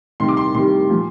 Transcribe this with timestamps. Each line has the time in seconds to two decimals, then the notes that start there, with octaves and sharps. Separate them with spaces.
0.20 C3 D#3 G3 C6
0.28 D6
0.37 C6
0.55 C3 D#3 G3 C6
0.90 A#2 F3